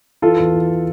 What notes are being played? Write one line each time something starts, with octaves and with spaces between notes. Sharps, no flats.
E3 F4 A4
E2
E3